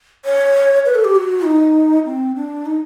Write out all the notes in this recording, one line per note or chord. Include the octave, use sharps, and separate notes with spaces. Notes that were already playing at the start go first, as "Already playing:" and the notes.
C#5
B4
A4
G4
F#4
D#4
C4
D4
D#4